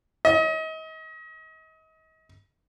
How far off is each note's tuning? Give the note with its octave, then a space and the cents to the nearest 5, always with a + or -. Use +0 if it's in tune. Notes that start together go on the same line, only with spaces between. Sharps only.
D#5 +35